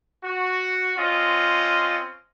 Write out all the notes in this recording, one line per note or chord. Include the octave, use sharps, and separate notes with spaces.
F#4
C4 C#4 F4 D#5